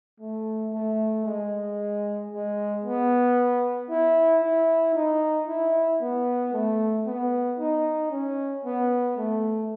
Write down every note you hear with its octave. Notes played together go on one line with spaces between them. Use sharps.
A3
A3
G#3
G#3
B3
E4
E4
D#4
E4
B3
A3
B3
D#4
C#4
B3
A3